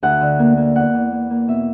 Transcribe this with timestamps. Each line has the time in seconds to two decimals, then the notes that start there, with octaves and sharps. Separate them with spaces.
0.03 D2 F#5
0.21 D3
0.39 A#3
0.57 A#3
0.75 E2 F#5
0.94 E2
1.12 A#3
1.30 A#3
1.48 B2 E5